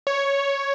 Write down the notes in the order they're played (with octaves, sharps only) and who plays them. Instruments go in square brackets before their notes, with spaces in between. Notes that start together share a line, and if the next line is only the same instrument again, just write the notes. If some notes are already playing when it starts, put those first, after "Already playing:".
[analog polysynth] C#5